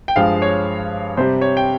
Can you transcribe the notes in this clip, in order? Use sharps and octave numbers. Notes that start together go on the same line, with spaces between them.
G5
G2 F3 G#3 F5
C#5
C3 G3 C5
C#5
G5